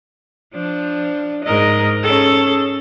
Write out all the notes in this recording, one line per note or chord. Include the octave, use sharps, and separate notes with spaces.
F3 D4
G#2 A#4 D#5
C#4 G#4 A4